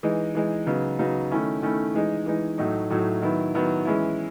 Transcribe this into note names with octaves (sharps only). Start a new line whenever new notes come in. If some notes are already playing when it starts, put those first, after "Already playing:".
E3 G#3 D#4
E3 G#3 D#4
C#3 F#3 B3 D#4
C#3 F#3 B3 D#4
D#3 A3 C#4 E4
D#3 A3 C#4 E4
E3 G#3 D#4
E3 G#3 D#4
A2 F#3 A3 D#4
A2 F#3 A3 D#4
D#3 F#3 B3 E4
D#3 F#3 B3 E4
E3 G#3 C#4 E4